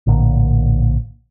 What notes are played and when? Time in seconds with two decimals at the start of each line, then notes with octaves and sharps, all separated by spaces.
0.07 A#1 A2 D3 A#3